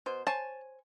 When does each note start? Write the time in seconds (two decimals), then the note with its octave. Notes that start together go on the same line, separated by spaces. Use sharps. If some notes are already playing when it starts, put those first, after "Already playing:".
0.06 B2 C5
0.27 C5 C#5 G#5 A5